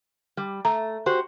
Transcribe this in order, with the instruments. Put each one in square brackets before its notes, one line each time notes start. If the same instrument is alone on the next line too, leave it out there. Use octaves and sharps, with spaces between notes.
[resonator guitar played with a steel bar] G3
[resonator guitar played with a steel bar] A3 [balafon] A#5
[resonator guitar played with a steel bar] F#4 G4 C5